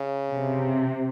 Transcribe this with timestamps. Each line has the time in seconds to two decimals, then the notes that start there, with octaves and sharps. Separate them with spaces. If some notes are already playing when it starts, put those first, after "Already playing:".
Already playing: C#3
0.33 C3